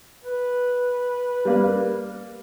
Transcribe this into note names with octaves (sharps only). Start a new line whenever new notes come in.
B4
G3 A#3